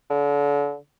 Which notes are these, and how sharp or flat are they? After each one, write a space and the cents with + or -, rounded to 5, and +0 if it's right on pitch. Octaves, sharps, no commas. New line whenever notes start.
D3 -35